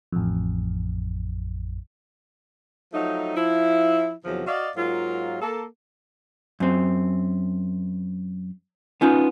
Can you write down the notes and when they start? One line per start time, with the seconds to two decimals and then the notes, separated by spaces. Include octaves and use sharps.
0.12 A1 F2
2.93 F3 F#3 A3 D#4
3.36 F3 E4
4.25 E2 C3 D#3 F3 F#3
4.47 F#4 D5 D#5 F5
4.76 G#2 F#3 A#3 F4
5.42 A#3 A4
6.60 F#2 C4
9.01 B3 C#4 D#4 F4